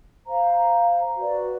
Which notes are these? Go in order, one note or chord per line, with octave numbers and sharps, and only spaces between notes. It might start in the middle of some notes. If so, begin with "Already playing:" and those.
C5 F5 A#5
F#4 B4 D5